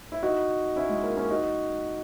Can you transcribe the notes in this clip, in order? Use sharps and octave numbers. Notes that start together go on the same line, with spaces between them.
E4
D#4 F#4
C#4 E4
G#3
A#3
A#3 C#4
D#4 F#4